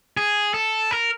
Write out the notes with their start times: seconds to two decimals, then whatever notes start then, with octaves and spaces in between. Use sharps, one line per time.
0.17 G#4
0.54 A4
0.91 A#4